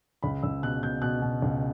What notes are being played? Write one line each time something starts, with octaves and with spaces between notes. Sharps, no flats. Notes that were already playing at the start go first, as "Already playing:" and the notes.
C#2 B5
C#2 E6
B2 F#6
B2 G6
B2 F#6
B2
C#2